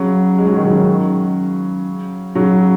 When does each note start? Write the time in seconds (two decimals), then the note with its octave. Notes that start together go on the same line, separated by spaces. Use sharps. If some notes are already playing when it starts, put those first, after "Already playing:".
Already playing: C#3 F#3
0.38 G#3
0.47 F#3
0.56 D#3
0.65 C#3 F#3
2.35 C#3 F#3